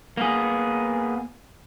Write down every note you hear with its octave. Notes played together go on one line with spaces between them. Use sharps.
A#3 B3 G#4